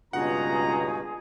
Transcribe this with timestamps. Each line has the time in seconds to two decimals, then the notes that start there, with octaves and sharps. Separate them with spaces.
0.13 C#2 G2 B2 D#4 F4 G#4 F#5 A#5